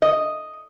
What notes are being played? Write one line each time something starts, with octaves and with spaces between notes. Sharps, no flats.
D#5